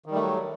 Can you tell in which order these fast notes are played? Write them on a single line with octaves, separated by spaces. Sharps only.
D#3 G3 A3 F#3